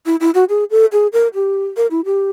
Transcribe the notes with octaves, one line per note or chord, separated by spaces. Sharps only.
E4
E4
F#4
G#4
A4
G#4
A#4
G4
A#4
E4
G4